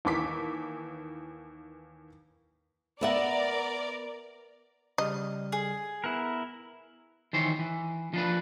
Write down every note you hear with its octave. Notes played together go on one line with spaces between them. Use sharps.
D#2 E3 D6 B6
B3 A#4 D5 E5 F#5
C#3 G3 D#5 F6
G#4
B3 E4 A#4 F#6
D#3 E3 C5 C#5
E3
F3 D4 B4